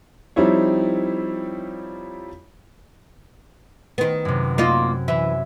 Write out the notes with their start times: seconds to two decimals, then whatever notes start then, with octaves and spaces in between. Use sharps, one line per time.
0.36 F3 G3 C4 D#4 E4 C#5
3.98 D#3 B3
4.25 F#2 C3
4.58 A#3 D#4 F4
5.08 E3 E5